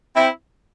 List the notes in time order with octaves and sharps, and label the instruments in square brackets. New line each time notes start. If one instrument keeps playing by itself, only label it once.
[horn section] C4 E4